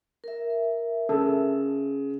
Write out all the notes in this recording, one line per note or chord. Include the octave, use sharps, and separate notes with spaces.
A#4 E5
C#3 A4